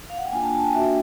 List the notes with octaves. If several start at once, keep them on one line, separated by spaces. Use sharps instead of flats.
F5
F#5
G5
A#3 D4 F4 G#5
A5
A5
G5
A#3 D4 F#4 E5